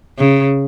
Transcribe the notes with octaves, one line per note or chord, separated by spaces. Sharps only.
C#3